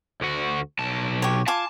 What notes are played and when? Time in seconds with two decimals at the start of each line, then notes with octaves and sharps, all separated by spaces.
0.21 D2 F#4
0.79 B1 A5
1.22 G4 C#5
1.48 F4 G#5 A5 D6